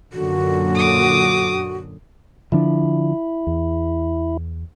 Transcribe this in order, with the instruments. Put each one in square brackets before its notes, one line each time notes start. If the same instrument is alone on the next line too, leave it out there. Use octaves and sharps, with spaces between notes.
[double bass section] F#2 A#2 D3 [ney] F#4
[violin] D6 D#6
[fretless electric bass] D3 F3 D4 [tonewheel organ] E4
[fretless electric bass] E2